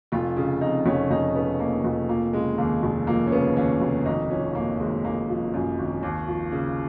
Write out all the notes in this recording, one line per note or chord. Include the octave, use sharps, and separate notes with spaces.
F1 F4
C#3
F2 D#4
F1 C#4
F1 D#4
C#3 B3
F2 A#3
F1
F3 A#3
C#3 G#3
D#2 A#3
F1
F3 A#3
C#4
C#3 B3
D#2 C#4
F1
G#1 D#4
F3 C#4
F#2 A#3
G#1 G#3
G#1 A#3
F3
F#2
G#1
D#2
F3
C#3